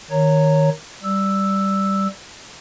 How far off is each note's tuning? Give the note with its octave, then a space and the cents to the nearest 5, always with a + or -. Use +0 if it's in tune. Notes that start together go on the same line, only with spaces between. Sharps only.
D#3 +0 C#5 +0 A#5 -15
G3 +0 E6 +0